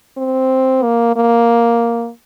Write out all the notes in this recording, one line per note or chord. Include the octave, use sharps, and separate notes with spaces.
C4
A#3
A#3